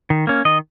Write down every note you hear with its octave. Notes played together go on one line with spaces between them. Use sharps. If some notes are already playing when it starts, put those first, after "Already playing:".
D#3
A#3 C#4
D#3 D#5